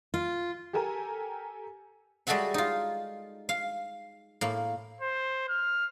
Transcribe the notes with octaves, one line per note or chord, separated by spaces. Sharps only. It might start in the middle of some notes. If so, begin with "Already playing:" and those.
F4
G4 A4 A#4 G#5 A#5
G3 G#3 F#4 A4 E5 F#5
D#4 F4
F5
A2 A#3
C5
F6